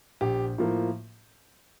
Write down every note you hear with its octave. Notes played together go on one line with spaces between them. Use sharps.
A#1 G4
A2 F3 A#3